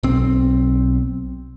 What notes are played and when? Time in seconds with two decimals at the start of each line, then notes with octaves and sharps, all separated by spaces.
0.03 B1 C4